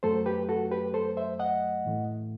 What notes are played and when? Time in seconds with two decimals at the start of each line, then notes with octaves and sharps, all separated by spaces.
0.03 F#2 F#3 A3 A4 C5
0.26 G4 B4
0.49 F#4 A4
0.71 G4 B4
0.94 A4 C5
1.17 C5 E5
1.39 D#5 F#5
1.85 A2 E3 A3